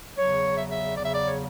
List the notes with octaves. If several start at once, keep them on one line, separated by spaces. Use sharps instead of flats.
E2 C#3 F#3 C#5
E5
E5
E2 C#3 F#3 D5
E5
D5
C#5